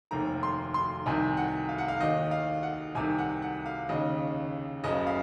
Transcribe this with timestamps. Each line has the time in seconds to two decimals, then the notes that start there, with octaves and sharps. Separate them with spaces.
0.11 F1 D#2 D#3 A#5
0.43 C6
0.74 C6
1.06 C2 C3 D#3 G#5
1.37 F#5
1.69 F5
1.78 F#5
1.88 F5
2.00 D#2 D#3 D#5
2.31 F5
2.63 F#5
2.95 C2 C3 D#3 G#5
3.18 F#5
3.42 F#5
3.66 F5
3.89 D#2 C#3 D#5
4.84 F#1 F#2 C#3 D#5
5.07 F5